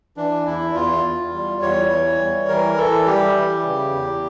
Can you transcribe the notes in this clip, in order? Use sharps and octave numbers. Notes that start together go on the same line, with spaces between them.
E3 D4
E2 E4
E2 F4
E2
G3
E2 C#5
E3
G3
E3 A#4
E3 A4
G3 G4
E3
C#3
E2